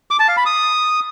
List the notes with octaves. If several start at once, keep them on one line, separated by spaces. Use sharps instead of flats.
D6
A5
F5
B5
D#6